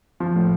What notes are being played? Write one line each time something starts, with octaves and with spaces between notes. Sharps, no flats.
F3 F4
A2